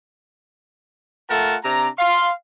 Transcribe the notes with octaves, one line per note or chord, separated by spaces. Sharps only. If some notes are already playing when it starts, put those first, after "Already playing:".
A3 F4 A#4 F#5 A5
C3 D4 A#5
F5 C6